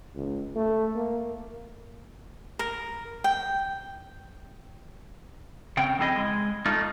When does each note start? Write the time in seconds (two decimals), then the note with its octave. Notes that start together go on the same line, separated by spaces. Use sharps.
0.15 C#2
0.56 A3
0.95 A#3
2.59 A#4
3.24 G5
5.77 C#3 C4 G5
5.99 F2 C4 E4 G#4 D#5
6.16 G#3
6.66 A3 D#4 F4